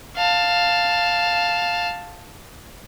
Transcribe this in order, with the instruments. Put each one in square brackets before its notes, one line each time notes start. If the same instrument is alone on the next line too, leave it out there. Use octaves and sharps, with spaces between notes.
[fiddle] F5 A5